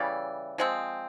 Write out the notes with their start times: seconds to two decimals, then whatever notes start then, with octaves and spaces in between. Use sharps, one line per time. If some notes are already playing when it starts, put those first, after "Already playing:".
Already playing: C#3 E3 G3 D5
0.58 F3 G#3 C4